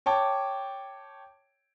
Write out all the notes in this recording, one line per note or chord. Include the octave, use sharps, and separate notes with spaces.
C#5 G5 A5 D6